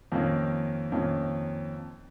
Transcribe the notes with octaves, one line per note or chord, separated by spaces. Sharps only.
F2 D#3 A#3 C#4
F2 D#3 A#3 C#4